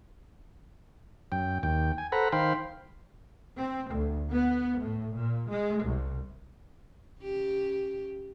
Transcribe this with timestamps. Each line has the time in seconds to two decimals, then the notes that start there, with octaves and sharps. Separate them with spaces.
1.32 F#2 G5
1.63 D#2 G5
1.98 G#5
2.12 A4 B4 C5 F#5 A#5 B5
2.32 D#3 C5 F5 G5 B5 C6
3.58 C4
3.93 D2
4.31 B3
4.81 A2
5.14 A#2
5.50 G#3
5.85 C2
7.22 C#3 G4